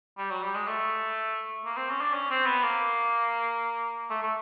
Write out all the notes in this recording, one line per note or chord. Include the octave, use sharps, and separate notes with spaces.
G3
F#3
G3
G#3
A3
A#3
C4
C#4
D4
C#4
C4
B3
A#3
A3
A3